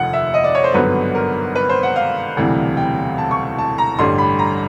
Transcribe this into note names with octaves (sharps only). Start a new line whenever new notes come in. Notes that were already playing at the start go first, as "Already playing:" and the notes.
Already playing: F1 D#2 D3 F3 A3 F#5
E5
D#5
D5
C#5
C5
G#1 G2 D3 F#3 B3 B4
A#4
B4
C5
F#5
F5
E1 D2 C3 E3 G3
G5
A5
C#6
A5
A#5
A1 G2 D3 G3 C6
B5
A#5